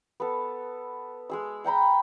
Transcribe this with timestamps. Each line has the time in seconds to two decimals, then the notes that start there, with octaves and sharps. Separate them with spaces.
0.20 B3 A4
1.29 G#3 G#4 E6
1.64 F#5 G5 A#5 B5